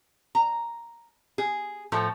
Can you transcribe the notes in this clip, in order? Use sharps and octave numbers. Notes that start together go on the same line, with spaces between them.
A#5
G#4
A2 F3 A4